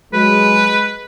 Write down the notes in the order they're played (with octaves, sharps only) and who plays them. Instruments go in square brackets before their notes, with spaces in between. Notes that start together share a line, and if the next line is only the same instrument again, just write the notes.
[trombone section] F#3 G#3 [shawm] B4